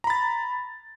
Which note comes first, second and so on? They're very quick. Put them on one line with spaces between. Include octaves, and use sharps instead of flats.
A#5 B5 A6